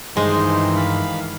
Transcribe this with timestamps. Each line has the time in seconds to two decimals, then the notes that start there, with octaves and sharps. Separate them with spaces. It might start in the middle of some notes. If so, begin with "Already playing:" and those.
0.17 G2 D#3 E3 G#3 D#4 C5
0.76 F5 B5